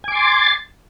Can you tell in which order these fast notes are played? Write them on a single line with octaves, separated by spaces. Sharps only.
G#5 D6 C6 A6